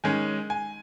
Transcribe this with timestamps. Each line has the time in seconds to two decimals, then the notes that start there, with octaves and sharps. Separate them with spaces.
0.04 D#3 G#3 C#4 G#5
0.50 G#5